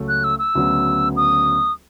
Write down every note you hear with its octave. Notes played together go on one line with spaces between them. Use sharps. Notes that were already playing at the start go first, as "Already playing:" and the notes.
Already playing: C#2 C#3 F#3 A3 C#4
F#6
E6
E6
D2 C#3 F#3 B3
D#6